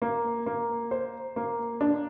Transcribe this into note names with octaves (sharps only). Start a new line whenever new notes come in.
A#3
A#3
C5
A#3
D4